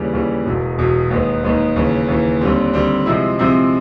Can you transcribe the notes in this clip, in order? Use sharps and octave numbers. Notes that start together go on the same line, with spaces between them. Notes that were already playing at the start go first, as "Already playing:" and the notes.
Already playing: D#2 C#3 E3 G3
D#2 C#3 E3 G3
E1 E2 B2
E1 E2 B2
D#2 D#3 G#3 B3
D#2 D#3 G#3 B3
D#2 C#3 E3
D#2 C#3 E3
D#2 D3 G3 C4
D#2 D3 G3 C4
C3 F3 G#3 C4 E4
C3 F3 G#3 C4 E4